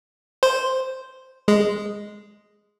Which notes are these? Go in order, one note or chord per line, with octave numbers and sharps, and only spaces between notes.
C5
G#3